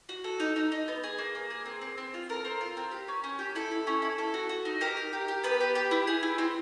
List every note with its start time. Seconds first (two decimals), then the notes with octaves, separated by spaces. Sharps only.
0.09 F#4
0.24 A4
0.40 D#4
0.56 D#4
0.72 D#4
0.88 B3
1.03 G#4
1.18 A#3
1.35 A#3
1.50 G#4
1.66 C4
1.81 C4
1.98 C4
2.14 F4
2.29 A4 A#4
2.45 C4
2.61 F4
2.77 C4
2.91 G4
3.08 C#4
3.24 C#4
3.39 G4
3.55 E4 A4
3.71 E4
3.87 C#4
4.02 E4
4.18 A4
4.34 F#4
4.49 F#4
4.65 D#4
4.81 G4 A#4
4.97 G4
5.13 G4
5.28 G4
5.44 B3 B4
5.60 G4
5.75 G4
5.91 E4
6.07 G#4
6.23 E4
6.38 C4